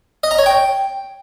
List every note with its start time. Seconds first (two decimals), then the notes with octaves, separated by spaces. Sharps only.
0.23 D#5
0.31 A#5
0.39 C#5
0.46 G5